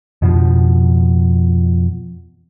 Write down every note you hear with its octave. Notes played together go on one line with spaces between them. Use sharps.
F2 B2 F3